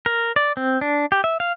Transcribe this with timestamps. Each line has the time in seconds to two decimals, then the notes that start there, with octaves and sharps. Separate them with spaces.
0.06 A#4
0.36 D5
0.57 C4
0.81 D4
1.12 G4
1.24 E5
1.40 F5